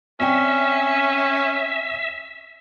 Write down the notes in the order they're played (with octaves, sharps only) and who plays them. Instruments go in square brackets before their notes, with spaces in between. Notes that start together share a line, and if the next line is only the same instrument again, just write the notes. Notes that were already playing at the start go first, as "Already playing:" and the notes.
[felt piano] C4 D5 G5 [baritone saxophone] C#4 [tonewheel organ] E5